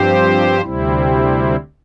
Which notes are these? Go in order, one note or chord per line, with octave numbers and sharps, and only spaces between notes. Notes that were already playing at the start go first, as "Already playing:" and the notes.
Already playing: G2 F3 C4 G4 C5
D2 C3 G3 C4 E4